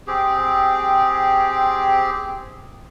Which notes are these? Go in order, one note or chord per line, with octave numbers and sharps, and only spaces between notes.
C4 G4 G#4